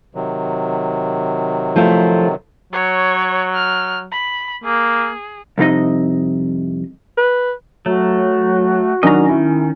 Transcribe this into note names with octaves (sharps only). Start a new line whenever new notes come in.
C3 D#3 F#3
F3 A3 E4
F#3 C#5
F6
B5
A#3 G#4
C2 F2 C3 D#4 D#5
B4
F#3 A3 F#4
D#3 F#3 C#4 D4 D#5 A#5
D#3 E4